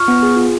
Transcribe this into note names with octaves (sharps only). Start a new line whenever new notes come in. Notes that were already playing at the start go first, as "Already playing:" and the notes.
Already playing: F4 C#6 F6
B3
G#4
F4